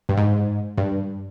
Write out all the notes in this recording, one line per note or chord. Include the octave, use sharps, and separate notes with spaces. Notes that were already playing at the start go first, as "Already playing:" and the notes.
G2
G#2
G2